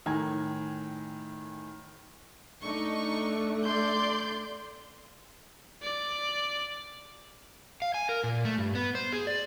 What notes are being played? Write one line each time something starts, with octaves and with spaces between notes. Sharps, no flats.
A2 D#3 G#5 A#5 G#6
A3 D4 D#4 C#6
D5 C6 G6
D5
F5
G#5
A#4
A#2
A3
G2
B3
C5
G#4
D5